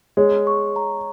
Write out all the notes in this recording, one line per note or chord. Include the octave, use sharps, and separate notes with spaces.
G#3 C#5
C#6
A#5